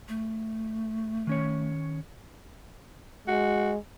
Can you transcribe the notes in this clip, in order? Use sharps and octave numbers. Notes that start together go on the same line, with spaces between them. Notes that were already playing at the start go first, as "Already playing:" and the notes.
A3
D#3 C#4 C#5
G#3 F#4